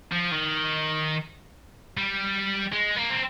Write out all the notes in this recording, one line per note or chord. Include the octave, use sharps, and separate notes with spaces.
F3
D#3
G3
G#3
A#3
C4